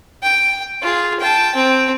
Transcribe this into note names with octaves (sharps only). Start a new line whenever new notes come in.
G5
F4 G#4
G5 A5
C4 G5